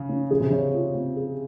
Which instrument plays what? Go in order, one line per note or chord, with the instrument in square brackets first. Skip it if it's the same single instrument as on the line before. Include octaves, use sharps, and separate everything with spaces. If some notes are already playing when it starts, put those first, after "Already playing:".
Already playing: [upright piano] C#3
[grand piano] C#4
[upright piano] C#3 [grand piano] G#4
[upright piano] C3
[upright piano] C#3 [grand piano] C#5
[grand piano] F4
C4
G#4